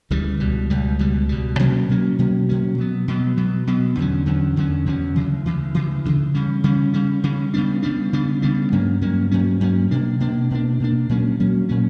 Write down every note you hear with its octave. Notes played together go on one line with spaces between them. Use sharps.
D2 C#3 E3 G3
C#2 B2 G3
C#2 B2 G3
C#2 B2 G3
C#2 B2 G3
B2 F#3 A#3 C#4
B2 F#3 A#3 C#4
B2 F#3 A#3 C#4
B2 F#3 A#3 C#4
B2 F#3 B3
B2 F#3 B3
B2 F#3 B3
B2 F#3 B3
E2 D3 F#3 C#4
E2 D3 F#3 C#4
E2 D3 F#3 C#4
E2 D3 F#3 C#4
D2 C#3 E3
D2 C#3 E3
D2 C#3 E3
D2 C#3 E3
C#3 G3 C#4
C#3 G3 C#4
C#3 G3 C#4
C#3 G3 C#4
C#3 G3 B3 D4
C#3 G3 B3 D4
C#3 G3 B3 D4
C#3 G3 B3 D4
G2 F#3 A#3 C#4
G2 F#3 A#3 C#4
G2 F#3 A#3 C#4
G2 F#3 A#3 C#4
B2 A#3 D4
B2 A#3 D4
B2 A#3 D4
B2 A#3 D4
A#2 F#3 A#3 C#4
A#2 F#3 A#3 C#4
A#2 F#3 A#3 C#4